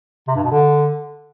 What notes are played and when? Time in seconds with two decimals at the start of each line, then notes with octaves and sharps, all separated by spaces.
0.28 C3
0.36 G2
0.44 B2
0.52 D3